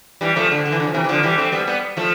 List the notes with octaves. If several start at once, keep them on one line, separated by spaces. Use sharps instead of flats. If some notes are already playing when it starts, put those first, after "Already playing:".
E3 G3
F3 A3
D3
D3
E3
D3
F3
C3 E3
E3
D3 F3
E3 G3
A3 C4
G3 B3
G3 B3
F3 A3